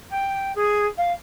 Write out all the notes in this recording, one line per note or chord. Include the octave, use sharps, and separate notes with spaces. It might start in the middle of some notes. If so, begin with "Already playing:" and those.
G5
G#4
F5